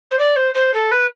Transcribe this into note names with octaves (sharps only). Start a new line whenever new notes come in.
C5
D5
C5
C5
A4
B4